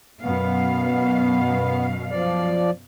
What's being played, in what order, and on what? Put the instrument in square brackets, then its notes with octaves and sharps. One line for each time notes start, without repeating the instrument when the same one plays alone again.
[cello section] F#2 B2 F5 [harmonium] B3
[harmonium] F3 D5